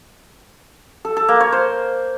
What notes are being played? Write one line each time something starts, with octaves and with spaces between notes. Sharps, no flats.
A4
A4
A#3
C#5
C5